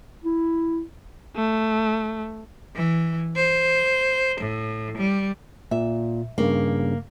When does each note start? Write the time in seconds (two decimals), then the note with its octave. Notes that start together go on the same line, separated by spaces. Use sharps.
0.25 E4
1.36 A3
2.75 E3
3.36 C5
4.41 A2
4.97 G3
5.71 A#2 E5
6.38 G2 C#3 A#3